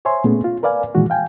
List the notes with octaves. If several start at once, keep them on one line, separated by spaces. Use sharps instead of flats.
C5 C#5 E5 G#5 C6
A#2 A3 B3 C#4 G#4
F4
A#4 B4 D5 F5 G#5
A#2 D#3 E3 G#3 F#4
F5 G5 G#5